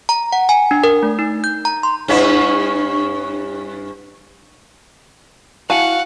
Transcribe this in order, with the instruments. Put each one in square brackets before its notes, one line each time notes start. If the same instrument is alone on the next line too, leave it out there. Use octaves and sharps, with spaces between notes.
[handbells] A#5
F#5
G#5
D4
A#4
A3
D#4
G6
A#5
C6
[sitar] G2 C#4 E4
[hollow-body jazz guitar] E4 G#5 A5 [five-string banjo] F#4 [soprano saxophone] F5 [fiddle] F#5